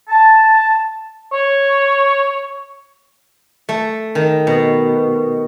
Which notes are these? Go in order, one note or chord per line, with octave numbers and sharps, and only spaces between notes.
A5
C#5
A3
D#3
B2